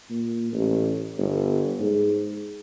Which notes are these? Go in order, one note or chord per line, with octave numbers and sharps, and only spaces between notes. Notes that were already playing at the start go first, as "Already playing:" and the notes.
A#2
A1
G1
G#2